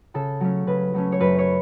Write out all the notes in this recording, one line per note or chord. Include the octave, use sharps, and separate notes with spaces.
C#3 A4
F#3 A3 C#4
C#3 B4
F#3 A3 C#4
C#5
F#2 B4
C#5